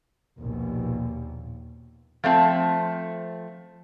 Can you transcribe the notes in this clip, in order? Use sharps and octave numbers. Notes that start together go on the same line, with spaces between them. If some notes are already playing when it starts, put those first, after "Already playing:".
A#1 D#2 B2
F3 A3 C4 A5